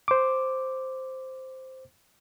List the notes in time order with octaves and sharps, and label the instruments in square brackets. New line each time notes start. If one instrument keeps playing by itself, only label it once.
[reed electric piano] C5 D6